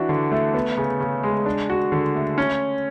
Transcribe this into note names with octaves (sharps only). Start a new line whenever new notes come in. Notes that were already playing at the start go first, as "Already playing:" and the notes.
Already playing: E3 D4 F#4
D3
A3
B3
C#3
C#3
G#3
D4
F#4
D3
A3
C#4